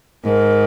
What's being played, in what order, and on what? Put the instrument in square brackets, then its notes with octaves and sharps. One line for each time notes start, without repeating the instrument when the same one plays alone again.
[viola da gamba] G#2 [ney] A#4